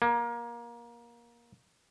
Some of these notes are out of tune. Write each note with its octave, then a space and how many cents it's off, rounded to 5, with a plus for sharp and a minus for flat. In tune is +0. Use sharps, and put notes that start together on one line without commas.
A#3 +20